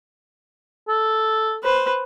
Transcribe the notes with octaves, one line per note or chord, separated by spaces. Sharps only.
A4
B4 C5